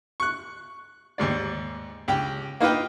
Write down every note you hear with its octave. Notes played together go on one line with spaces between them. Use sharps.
C#6 F#6
D#2 G#2 D5
C#2 G4 G5
A#3 D#4 F4 B4 G5